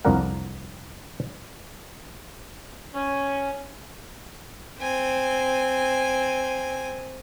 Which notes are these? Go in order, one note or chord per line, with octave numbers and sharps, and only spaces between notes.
C2 F2 A#3 D4 A#4 F#5
C#4
C4 G#5